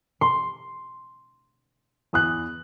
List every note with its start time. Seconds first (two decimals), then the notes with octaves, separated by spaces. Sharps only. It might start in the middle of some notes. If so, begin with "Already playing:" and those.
0.21 C6
2.13 E2 D#6 F#6